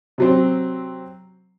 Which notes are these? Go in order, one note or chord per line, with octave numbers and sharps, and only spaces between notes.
C3 F#3 C4